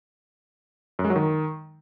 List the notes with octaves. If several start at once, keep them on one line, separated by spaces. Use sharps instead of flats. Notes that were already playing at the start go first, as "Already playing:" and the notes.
F#2
G#3
F#3
D#3